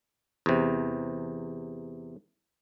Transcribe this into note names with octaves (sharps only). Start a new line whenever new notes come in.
E2 C3